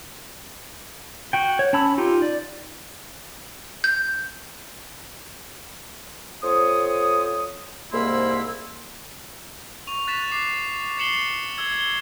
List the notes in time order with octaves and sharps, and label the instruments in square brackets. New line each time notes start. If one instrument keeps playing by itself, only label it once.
[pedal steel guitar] F#4 G5
C#5
C#4 A5 B5 E6
D#4 F4 G4
D5
[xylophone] G6
[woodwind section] F2 C5 C#5 D#6
C2 G#2 A#3 E4 C6 E6
[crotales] C#6 F7
F#6 A6 B6 E7
D6 C7
A6 C7 C#7 E7 F#7 G7
E6 G#6 G7
G7